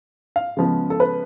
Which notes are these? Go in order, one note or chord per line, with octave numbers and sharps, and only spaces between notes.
F5
C#3 F3 G#3 B3
A4
B4